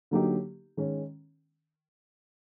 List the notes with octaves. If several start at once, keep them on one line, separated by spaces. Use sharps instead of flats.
D3 F#3 A#3 D#4 G4
D#3 G#3 C#4